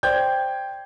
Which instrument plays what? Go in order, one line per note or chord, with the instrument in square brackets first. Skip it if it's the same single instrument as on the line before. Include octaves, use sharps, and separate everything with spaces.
[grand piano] C5 D5 G5 G6 G#6